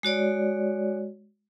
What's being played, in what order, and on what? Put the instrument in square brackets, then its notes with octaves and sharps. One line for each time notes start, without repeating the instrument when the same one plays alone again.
[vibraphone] G#3 F#4 C#5 D5